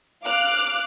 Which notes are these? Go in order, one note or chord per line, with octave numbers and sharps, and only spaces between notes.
F5 D6 F6 F#6